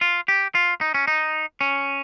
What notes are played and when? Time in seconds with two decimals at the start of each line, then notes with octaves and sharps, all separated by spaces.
0.01 F4
0.28 G4
0.55 F4
0.81 D#4
0.94 C#4
1.08 D#4
1.61 C#4